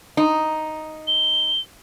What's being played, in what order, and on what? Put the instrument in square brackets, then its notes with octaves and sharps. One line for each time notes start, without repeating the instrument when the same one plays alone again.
[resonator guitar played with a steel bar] D#4
[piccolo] G7